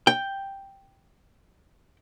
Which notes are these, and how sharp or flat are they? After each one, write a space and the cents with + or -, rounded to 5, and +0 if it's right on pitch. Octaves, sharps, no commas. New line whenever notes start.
G5 +0